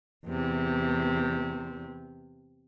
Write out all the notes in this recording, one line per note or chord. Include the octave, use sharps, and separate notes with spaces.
E2 C3